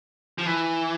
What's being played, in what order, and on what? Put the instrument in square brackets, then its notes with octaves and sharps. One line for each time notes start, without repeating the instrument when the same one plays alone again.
[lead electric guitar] F3
E3